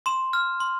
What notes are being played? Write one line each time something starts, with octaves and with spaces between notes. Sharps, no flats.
C6 E7
F6
C6